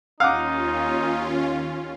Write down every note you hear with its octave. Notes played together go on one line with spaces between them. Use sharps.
D#2 C#4 D#4 F4 F5 F#5 D6